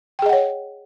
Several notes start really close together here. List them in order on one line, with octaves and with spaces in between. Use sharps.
G5 G#4 D#5 F#5 C#5